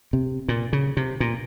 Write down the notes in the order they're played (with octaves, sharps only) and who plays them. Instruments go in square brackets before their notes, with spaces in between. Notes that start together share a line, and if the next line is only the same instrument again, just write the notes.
[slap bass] C3
A#2
C#3
C3
A#2